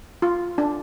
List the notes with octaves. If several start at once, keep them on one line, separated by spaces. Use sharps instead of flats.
F4
D4